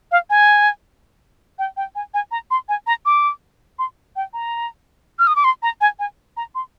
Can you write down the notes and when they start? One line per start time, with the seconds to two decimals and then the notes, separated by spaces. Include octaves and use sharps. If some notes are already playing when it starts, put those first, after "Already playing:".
0.12 F5
0.30 G#5
1.59 G5
1.77 G5
1.95 G#5
2.14 G#5
2.31 A#5
2.51 C6
2.69 G#5
2.87 A#5
3.06 D6
3.79 C6
4.16 G5
4.33 A#5
5.19 F6
5.27 D#6
5.36 D6
5.44 C6
5.63 A#5
5.81 G#5
5.99 G#5
6.37 A#5
6.55 C6